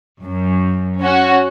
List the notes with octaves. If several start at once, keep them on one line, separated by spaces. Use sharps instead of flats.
F#2
C#4 F#4